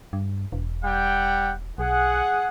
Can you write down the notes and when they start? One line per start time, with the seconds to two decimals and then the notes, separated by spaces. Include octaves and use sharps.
0.13 G2
0.52 E1
0.83 G3 F#5 G5
1.78 B1 G#4 F#5